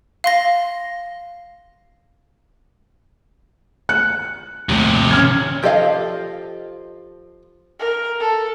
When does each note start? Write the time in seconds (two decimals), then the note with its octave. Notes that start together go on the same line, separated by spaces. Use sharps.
0.24 F5 C6 A#6
3.89 F#6 C#7
4.69 F1 D#2 C3
5.11 C#4 F6 G#6
5.63 F3 G4 A4 D#5 F5
7.79 A#4
8.20 A4